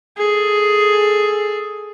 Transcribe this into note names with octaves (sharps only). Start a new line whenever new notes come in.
G#4 A4